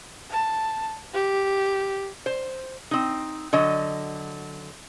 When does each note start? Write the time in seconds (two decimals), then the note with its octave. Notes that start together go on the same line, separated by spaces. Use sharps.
0.30 A5
1.14 G4
2.26 C5
2.91 C4 D#4
3.53 D3 F#3 D#5